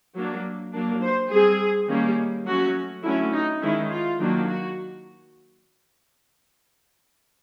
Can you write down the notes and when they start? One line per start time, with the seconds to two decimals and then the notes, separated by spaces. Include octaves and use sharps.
0.15 F#3 A#3 D4
0.73 F#3 A#3 D4
1.02 C5
1.31 G3 C4 G#4
1.88 D#3 G3 A#3 C#4
2.46 F#3 A3 C#4 F#4
3.04 D3 F#3 A3 C#4 E4
3.33 D#4
3.62 D#3 G#3 C#4 E4
3.91 F4
4.19 D#3 F#3 A#3 D4
4.48 F#4